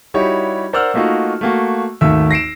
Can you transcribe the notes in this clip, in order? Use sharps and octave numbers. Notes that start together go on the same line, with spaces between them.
G3 D#4 E4 F#4 G4 C#5
A#4 C5 D5 F#5 E6 F6
A3 A#3 D#4 F4 F#4
A3 A#3 F#4
G#1 D#2 A3 E5 E6
A#6 C7 D7 E7